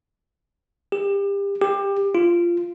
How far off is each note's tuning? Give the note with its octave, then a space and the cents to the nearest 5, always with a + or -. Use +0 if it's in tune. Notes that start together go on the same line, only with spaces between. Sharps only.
G4 +30
G4 +20
F4 -15